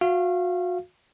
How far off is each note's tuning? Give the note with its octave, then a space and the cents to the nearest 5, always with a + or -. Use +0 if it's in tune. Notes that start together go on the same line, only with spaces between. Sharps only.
F#4 -35 F5 -25